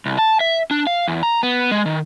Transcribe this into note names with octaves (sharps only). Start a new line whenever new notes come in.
C2
A5
E5
D4
F5
E2
A#5
B3
G#3
D#3